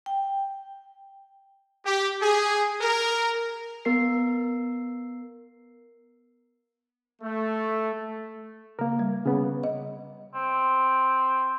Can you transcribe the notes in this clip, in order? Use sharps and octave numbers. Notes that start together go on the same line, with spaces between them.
G5
G4
G#4
A#4
B3 A#4 C7
A3
C#3 A#3 A#4
G3
C#3 B3
D#5
C4